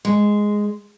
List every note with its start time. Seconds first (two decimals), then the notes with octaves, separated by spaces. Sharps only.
0.05 G#3